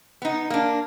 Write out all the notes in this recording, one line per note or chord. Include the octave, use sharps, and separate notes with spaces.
B3 D#4
A#3 D4